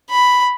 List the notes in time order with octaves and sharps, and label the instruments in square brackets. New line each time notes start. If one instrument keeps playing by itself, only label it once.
[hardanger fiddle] B5